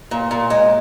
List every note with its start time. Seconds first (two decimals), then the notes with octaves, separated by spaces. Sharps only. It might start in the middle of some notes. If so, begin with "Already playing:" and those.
0.11 A#2
0.31 A#2
0.50 G#3